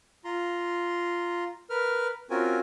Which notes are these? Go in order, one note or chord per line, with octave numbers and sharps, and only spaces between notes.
F4 A#5 C6
A#4 B4 F6
C4 C#4 F4 F#4 A#4 G#5